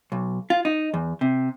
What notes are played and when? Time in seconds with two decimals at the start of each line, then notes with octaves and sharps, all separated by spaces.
0.12 B1
0.50 F4
0.65 D#4
0.94 E2
1.21 C3